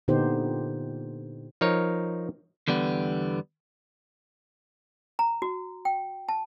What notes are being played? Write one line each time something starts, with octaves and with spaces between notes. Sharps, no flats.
A#2 D3 B3 D#4 G4 C5
F3 D#4 A#4 C#5
E2 D3 G3 B3
A#5
F#4
G5
A5